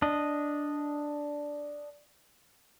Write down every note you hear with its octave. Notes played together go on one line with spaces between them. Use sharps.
D4 D#5